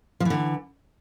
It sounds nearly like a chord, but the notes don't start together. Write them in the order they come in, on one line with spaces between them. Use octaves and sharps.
F3 E3 D3